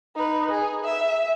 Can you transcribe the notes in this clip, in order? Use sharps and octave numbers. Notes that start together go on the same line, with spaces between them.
D#4 B4
G#4
E5